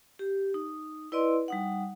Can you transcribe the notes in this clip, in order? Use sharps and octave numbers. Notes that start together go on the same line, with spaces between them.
G4
D#4
E4 B4 D5 D#5 C6
G3 D#4 F#5